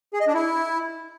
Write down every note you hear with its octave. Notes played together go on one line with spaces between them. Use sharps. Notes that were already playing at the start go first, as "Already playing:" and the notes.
G#4
D#5
D4
E4